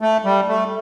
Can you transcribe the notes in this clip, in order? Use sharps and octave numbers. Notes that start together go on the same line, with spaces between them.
A3
G3
A3